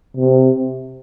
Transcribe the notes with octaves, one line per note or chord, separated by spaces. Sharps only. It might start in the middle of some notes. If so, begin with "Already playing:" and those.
C3